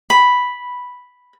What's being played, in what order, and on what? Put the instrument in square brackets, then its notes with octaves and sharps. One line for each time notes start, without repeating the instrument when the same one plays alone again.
[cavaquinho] B5